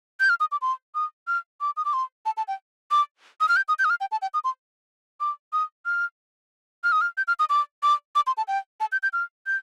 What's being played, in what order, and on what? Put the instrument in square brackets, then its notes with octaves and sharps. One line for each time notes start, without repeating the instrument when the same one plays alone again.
[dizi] G6
F6
D#6
D6
C6
D#6
F6
D6
D#6
D6
C6
A5
A5
G5
D6
D#6
F6
G6
D#6
G6
D#6
F6
G5
A5
G5
D#6
C6
D6
D#6
F6
F6
D#6
F6
G6
F6
D#6
D6
D6
D6
C6
A5
G5
A5
G6
G6
F6
G6